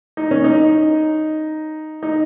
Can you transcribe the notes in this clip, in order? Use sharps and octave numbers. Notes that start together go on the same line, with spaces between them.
D#4
C#4
D#4
D#4